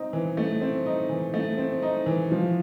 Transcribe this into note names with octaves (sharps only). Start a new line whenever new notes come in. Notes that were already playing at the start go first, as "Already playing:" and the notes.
Already playing: C4 D#4
E3
A3
C4
D#4
E3
A3
C4
D#4
E3
F3